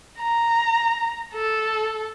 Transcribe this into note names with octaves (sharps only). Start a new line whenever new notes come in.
A#5
A4